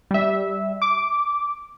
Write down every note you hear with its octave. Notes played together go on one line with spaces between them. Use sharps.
G3 E5
D6